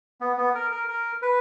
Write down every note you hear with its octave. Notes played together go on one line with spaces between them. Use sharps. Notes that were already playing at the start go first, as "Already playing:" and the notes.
B3
B3
A#4
A#4
A#4
B4